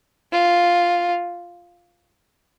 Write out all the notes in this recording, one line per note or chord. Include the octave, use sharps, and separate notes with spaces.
F4